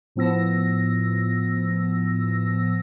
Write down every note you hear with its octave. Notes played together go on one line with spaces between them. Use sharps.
A2 F3 B3 E6 A#6